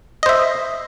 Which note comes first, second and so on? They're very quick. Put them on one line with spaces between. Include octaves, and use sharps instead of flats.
D#5 C5 E5